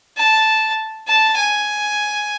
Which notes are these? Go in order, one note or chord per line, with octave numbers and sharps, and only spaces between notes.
A5
A5
G#5